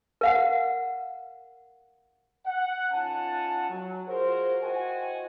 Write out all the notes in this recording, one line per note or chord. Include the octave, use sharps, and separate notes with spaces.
A#4 F5 F#5
F#5
D#3 C#4 F4 F#5 G#5 A5
F#3
F4 F#4 G#4 A#4 C5
E4 F#4 C5 D#5 G5 G#5